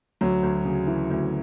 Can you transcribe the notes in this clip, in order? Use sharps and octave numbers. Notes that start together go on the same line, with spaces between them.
D2 F#3
D2
C#3
E3
D2